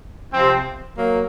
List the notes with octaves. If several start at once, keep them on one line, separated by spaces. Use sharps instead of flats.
C3 F3 C4
F#3 A#3